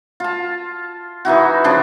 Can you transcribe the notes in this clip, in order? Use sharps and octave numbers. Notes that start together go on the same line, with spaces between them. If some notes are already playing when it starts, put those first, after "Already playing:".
F4 A5
E3 D#4 E4 F#4
C#3 F3 D4